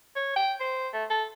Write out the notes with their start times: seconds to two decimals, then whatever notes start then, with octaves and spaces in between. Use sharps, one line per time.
0.16 C#5
0.36 G5
0.60 C5
0.93 A3
1.10 A4